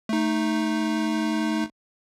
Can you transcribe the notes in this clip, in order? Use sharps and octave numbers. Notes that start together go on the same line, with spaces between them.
A3 D#4